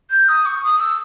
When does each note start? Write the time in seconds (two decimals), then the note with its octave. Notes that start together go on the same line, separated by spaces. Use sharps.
0.11 G6
0.28 D#6
0.46 C#6
0.63 D#6
0.80 E6